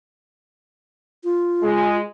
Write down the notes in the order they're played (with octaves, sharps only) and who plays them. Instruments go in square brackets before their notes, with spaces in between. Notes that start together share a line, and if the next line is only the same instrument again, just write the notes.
[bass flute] F4
[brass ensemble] G#3